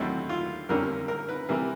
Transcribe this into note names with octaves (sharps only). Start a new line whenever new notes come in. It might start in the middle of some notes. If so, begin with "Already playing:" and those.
Already playing: D#2 D3 F#3 A3 C4 E4
F4
F2 D3 G3 A#3 C#4 A#4
A#4
B4
C3 E3 G3 A#3 A#4